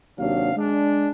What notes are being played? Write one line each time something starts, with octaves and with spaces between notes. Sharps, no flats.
D#2 C3 F#3 D4 F5
G#3 D4